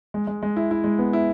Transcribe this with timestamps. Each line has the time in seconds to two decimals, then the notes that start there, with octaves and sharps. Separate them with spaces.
0.14 G#3
0.27 G#3
0.43 G#3
0.57 E4
0.71 E4
0.84 G#3
0.99 B3
1.13 E4